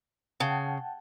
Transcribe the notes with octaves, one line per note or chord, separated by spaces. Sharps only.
C#3 F#5 G5 A5